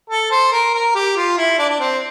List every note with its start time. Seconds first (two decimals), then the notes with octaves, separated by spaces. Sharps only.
0.10 A4
0.31 C5
0.52 A#4
0.74 A#4
0.95 G4
1.16 F4
1.37 E4
1.58 D4
1.69 D4
1.80 C4